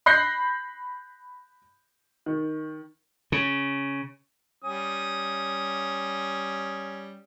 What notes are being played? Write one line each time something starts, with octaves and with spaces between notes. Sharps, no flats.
B5 F#6 G6 A#6 C7
D#3
C#3
G3 C#4 D#6